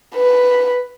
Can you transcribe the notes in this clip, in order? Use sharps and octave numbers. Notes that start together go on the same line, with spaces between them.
B4